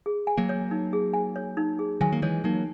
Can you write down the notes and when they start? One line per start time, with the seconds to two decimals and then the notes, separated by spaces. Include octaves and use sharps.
0.06 G#4
0.27 G#5
0.38 F#3 A#3
0.49 C#5
0.71 D#4
0.93 G#4
1.13 G#5
1.36 C#5
1.57 D#4
1.79 G#4
2.01 D#3 F#3 G#5
2.13 A#3
2.22 E3 G#3 C#5
2.44 F#3 A#3 D#4